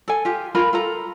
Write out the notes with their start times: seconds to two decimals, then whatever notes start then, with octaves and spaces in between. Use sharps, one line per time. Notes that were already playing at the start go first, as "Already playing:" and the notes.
0.08 A4 G#5
0.25 F4 G4
0.55 F4 A#4 B5
0.73 F4 A4 A#5